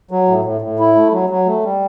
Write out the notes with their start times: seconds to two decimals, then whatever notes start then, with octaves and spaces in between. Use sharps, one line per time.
0.11 F#3
0.28 A2
0.45 A2
0.61 A2
0.79 E4
0.95 A3
1.12 F#3
1.29 F#3
1.46 A3
1.64 G3